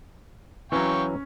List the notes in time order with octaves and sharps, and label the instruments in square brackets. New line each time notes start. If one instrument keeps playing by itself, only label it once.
[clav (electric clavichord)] E3 F#3 [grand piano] C#4 [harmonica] F5 G5 C#6